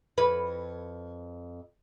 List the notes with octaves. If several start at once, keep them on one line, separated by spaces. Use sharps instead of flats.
F2 B4